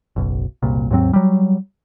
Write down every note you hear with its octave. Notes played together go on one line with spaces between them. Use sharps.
F#1 B1
F#1 C2 A#2
D#2 G#2 F#3 C4
F#3 G3